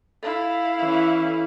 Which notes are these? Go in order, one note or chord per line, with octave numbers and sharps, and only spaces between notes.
E4 A4 F5
E3 C#4